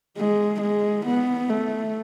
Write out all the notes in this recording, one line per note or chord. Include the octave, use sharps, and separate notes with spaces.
G#3
G#3
B3
A3